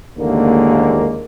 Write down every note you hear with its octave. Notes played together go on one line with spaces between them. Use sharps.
A1 D#2 D3 G#3 A#3